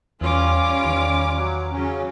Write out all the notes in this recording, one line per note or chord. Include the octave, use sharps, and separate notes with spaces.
E2 G3 C#4 F4 D6
E2 D#3
F#3
C#3 F#3 C#4